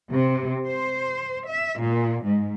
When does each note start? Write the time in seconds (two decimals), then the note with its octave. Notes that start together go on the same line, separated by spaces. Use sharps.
0.12 C3
0.65 C5
1.47 E5
1.79 A#2
2.25 G#2